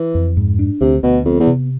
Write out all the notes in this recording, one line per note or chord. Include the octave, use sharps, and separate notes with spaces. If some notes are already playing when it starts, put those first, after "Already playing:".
Already playing: E3
F2
G#2
D4
D2 C3
D2 B2
F2 B3
E2
C3